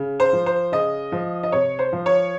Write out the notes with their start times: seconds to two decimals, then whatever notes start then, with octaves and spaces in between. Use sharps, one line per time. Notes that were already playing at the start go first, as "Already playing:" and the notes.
Already playing: C#3
0.20 C5
0.33 F3
0.46 C5
0.72 C#3 D#5
1.12 F3
1.43 D#5
1.52 C3 C#5
1.79 C5
1.92 F3
2.06 C#5